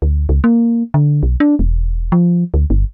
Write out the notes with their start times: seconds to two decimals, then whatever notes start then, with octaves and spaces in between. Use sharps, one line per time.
0.02 D2
0.29 C#2
0.44 A#3
0.94 D3
1.23 B1
1.40 D4
1.59 E1
2.12 F3
2.54 D2
2.70 G1